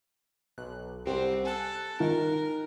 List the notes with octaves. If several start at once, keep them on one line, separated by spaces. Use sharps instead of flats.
B1 F#6
C2 C4 G4 F#5
A4 G#5 F#6
D#3 A#4